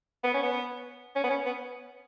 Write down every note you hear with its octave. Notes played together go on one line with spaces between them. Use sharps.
B3
C#4
B3
C#4
B3
C#4
B3